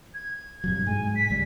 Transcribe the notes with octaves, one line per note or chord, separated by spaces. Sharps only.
G#6
G2 C3 F#3
G#2 G#3 G#5
B6
C#2 G3